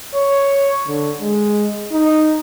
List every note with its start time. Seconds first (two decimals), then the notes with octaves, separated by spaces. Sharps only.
0.15 C#5
0.88 D3
1.21 G#3
1.92 D#4